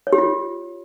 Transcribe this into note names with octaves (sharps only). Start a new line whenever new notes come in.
C#5
G4
F4